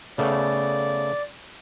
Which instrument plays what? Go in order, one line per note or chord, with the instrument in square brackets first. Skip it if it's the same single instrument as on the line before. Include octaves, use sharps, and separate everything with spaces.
[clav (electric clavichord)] C#3 A3 B3 [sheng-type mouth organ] D5